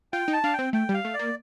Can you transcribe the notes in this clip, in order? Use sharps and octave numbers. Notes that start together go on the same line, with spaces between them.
F4 G5
D#4
A5
D4 F5
G5
C4
A3 G5
G3 F5
A3
D5
A#3